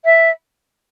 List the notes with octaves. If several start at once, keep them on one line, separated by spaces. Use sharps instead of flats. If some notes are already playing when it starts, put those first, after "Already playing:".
E5